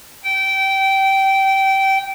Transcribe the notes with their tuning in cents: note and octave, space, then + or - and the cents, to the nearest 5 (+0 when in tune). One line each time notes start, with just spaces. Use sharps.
G5 -20